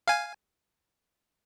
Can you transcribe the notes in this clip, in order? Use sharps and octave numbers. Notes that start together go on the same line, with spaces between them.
F5 G#5